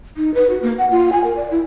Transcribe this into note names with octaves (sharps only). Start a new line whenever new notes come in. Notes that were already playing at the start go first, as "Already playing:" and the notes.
D#4
B4
F#4
A#3
F#5
F4
G#5
A#4
D5
E4